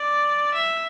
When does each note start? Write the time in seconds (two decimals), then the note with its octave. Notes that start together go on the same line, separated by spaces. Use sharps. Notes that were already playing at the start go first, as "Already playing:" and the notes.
Already playing: D5
0.54 E5